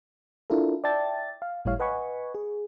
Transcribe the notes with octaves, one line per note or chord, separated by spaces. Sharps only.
D4 E4 F4 A4 A#4
D5 E5 G5 A5 A6
F5
G#1 A2 G3 E4 C#5 F5
B4 D#5 F#5 G#5 B5 C#6
G#4